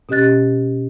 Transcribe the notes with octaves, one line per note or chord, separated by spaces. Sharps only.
B2 C#4 G4 D#5 F#6 A6